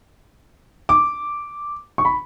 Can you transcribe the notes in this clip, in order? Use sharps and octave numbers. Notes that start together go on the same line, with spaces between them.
D6
C#6
B5